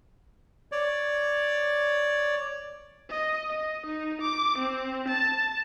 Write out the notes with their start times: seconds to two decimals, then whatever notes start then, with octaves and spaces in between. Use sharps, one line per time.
0.72 C#5 D5
3.10 D#5
3.50 D#5
3.87 D#4
4.22 D6
4.59 C4
5.09 A5